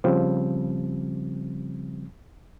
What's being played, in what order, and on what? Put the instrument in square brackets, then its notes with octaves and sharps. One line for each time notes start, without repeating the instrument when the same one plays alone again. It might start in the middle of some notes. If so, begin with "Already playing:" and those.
[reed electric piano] C#3 F3 G3 C4